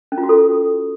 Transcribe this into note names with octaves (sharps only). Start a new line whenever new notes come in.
C#4
F4
F#4
A4